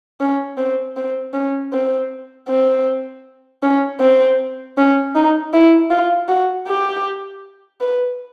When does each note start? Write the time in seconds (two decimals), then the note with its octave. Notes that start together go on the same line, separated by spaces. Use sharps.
0.20 C#4
0.58 C4
0.97 C4
1.33 C#4
1.73 C4
2.48 C4
3.63 C#4
4.00 C4
4.77 C#4
5.15 D#4
5.53 E4
5.90 F4
6.28 F#4
6.68 G4
7.81 B4